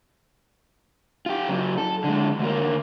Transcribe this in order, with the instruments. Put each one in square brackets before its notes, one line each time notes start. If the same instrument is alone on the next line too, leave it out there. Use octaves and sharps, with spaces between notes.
[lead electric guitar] F4 G4
C#3 F#3
A4
D3 G#3
D2 A#3